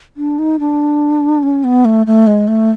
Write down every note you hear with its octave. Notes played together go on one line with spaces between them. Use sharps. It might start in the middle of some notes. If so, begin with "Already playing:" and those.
D4
D#4
D4
C#4
B3
A3
A3
G#3
A3